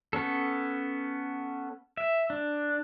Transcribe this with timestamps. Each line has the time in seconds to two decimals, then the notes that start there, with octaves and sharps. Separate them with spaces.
0.13 B3 C#4 A4
1.97 E5
2.30 D4